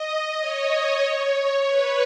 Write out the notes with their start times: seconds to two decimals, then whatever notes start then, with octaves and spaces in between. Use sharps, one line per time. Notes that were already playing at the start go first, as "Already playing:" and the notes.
Already playing: D#5
0.40 C#5
1.67 B4